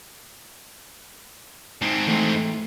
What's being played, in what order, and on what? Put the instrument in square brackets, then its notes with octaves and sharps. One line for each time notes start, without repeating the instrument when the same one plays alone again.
[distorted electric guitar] G#2 C4
[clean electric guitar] E3 A3